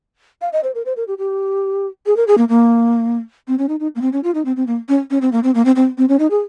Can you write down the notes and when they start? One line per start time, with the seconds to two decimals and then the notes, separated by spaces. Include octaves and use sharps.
0.41 F5
0.53 D#5
0.64 C5
0.75 A#4
0.85 C5
0.97 A#4
1.08 G4
1.18 G4
2.06 G#4
2.16 A#4
2.27 G#4
2.38 A#3
2.49 A#3
3.48 C4
3.58 C#4
3.69 D#4
3.80 D#4
3.95 A#3
4.01 C4
4.12 C#4
4.23 F4
4.34 D#4
4.45 C4
4.56 C4
4.67 A#3
4.89 C#4
5.10 C#4
5.21 C4
5.32 A#3
5.43 C4
5.54 A#3
5.65 C4
5.76 C4
5.98 C4
6.09 C#4
6.19 D#4
6.30 G#4